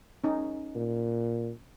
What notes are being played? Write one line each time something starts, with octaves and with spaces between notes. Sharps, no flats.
C#4 D#4
A#2